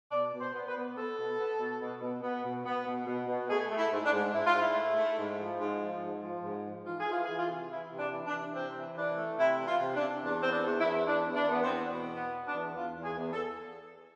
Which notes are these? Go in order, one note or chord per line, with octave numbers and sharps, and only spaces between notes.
B2 D5
B2
C5
B3
B4
B3
B3 A4
B2
B3
B2
B2
B2
B3
B2
B3
B2
B2
B2
A3 G#4
A3
E4
G#2
D4
G#2
G#2 E4
F4
G#2 E4
A3
A3
G#2
F3
G#2
F3
G#2
F3
G#2
F3
E3 F4
G#4
E3 F4
E3 G#4
F4
C3
E3 E4
C3
D4
E3
D4
E3
C3 C4
E3
E3 D4
A3
C3 E4
E3
F4
C3
D4
C3
E2 D4
B3 C4
D4
E2
E4
E2
E2 D4
E2
D4
B3
C4
E2
B2
B3
B3
D4
E2
E2 F4
E2
G#4
E2
A4